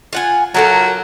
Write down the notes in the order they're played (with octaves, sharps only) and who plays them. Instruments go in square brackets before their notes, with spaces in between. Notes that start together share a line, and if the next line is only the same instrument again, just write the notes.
[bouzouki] F4 F#5 G#5
[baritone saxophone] F#3 [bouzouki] F4 A4 A#4